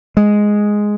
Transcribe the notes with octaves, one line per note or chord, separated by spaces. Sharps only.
G#3